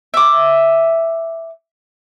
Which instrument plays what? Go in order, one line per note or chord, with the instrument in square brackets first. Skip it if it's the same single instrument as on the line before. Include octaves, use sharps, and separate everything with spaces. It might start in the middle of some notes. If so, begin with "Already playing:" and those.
[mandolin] E5 D6